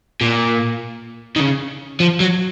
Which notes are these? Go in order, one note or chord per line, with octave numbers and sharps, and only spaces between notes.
A#2
D#3
C#3
F3
F#3